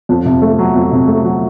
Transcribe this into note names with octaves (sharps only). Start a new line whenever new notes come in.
F2
C3
A3
F#3
F2
C3
A3
F#3